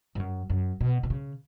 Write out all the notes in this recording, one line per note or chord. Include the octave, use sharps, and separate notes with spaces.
G2
F#2
F#2
B2
B2
C#3